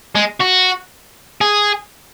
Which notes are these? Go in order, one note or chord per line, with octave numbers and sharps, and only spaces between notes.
G#3
F#4
G#4